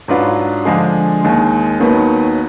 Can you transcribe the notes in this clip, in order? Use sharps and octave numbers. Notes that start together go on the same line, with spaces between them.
G#2 F#3 D4 F4 B4
D3 F3 G#3 D4 G#4
D#2 D#3 G#3
D#2 D#3 F#3 B3